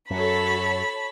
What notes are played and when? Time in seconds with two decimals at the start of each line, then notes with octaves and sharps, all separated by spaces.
0.10 F#2 F#4 A4 C#5 A5 B5